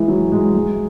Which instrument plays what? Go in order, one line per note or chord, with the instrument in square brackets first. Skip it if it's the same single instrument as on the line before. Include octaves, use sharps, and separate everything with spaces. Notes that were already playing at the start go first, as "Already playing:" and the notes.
Already playing: [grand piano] E3 G#3
F#3
G#3
G#3